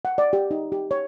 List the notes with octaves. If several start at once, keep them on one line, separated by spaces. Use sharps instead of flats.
F#5
D5
G4
D#4
G4
C#5